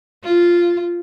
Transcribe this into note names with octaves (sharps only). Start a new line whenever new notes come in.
F4